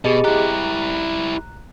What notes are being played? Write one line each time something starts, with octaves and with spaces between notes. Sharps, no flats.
B2 G4 G#4 D#5
E4 G4 A#5 F#6